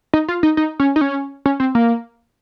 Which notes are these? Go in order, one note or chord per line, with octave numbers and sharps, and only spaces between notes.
D#4
F4
D#4
D#4
C#4
D#4
C#4
C#4
C4
A#3